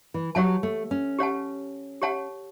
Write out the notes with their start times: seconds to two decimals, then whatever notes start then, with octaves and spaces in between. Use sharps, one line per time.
0.14 E3
0.35 F#3 G4 C#5 F#5 A5
0.63 A3
0.91 C#4
1.19 G4 C#5 F#5 A5
2.02 G4 C#5 F#5 A5